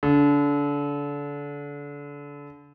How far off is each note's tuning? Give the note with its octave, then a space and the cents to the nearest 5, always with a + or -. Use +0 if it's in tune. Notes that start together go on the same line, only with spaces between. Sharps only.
D3 -30